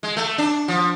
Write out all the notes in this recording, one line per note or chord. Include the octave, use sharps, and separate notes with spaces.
G#3
A3
D4
F3